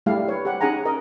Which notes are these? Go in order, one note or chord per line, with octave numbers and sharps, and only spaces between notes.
G3 A3 E4 G4 A4 F5
B4 C#5
G4 F#5
C#4 D#4 G#4 F#5 G#5 A#5
A#4 D#5